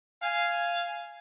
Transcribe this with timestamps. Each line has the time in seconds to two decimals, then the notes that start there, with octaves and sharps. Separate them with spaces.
0.22 F5 G#5